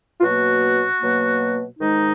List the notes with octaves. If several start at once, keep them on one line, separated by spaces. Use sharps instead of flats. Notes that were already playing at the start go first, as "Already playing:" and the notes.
F4
B2 F#3 A#3 F#4
B2 F#3 A#3
G#2 D#3 G#3 D#4